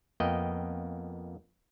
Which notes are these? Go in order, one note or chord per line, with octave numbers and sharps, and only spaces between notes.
F2 A#3 B3 D#5 G5